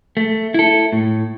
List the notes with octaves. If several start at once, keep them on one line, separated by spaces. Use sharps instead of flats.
A3
E4 A4
A2